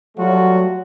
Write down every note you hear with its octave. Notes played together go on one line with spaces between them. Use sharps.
F#3 G3 A3 F4 F#4